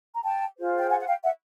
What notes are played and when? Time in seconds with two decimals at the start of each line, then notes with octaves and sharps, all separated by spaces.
0.14 A#5
0.23 G5 A5
0.57 F4 G#4 C5
0.79 G5
0.90 F#5 G#5
1.01 F#5
1.07 F5 G5
1.24 E5 F#5